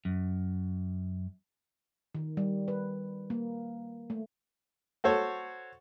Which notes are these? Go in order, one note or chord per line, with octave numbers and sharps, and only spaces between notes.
F#2
D#3
G3
B4
A#3
A3
F#4 A4 C5 C#5